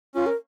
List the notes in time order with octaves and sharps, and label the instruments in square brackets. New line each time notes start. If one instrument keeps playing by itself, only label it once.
[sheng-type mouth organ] C#4 [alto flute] F4
[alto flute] A#4